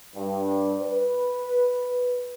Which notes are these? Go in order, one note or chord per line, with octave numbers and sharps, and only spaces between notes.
G2
B4